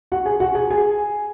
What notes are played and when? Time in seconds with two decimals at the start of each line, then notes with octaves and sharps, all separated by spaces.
0.12 F#4 F#5
0.26 G#4 G#5
0.40 F#4 F#5
0.55 G#4 G#5
0.71 G#4 G#5